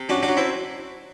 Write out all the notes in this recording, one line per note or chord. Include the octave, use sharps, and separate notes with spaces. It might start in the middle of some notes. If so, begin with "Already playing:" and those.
Already playing: C3
F#2 D4 F#4
D4 F#4
F#3
C4 E4